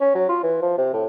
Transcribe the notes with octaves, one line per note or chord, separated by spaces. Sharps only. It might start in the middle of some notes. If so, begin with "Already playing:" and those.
C#4
F#3
F4
E3
F3
C3
A2